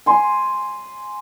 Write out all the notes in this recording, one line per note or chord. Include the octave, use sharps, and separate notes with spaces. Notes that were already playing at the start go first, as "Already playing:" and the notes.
G#5 C6